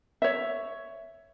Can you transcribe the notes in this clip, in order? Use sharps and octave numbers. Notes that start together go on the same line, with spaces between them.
C#5 E5